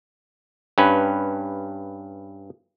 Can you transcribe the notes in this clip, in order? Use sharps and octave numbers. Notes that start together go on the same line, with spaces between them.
G2 C#4 B4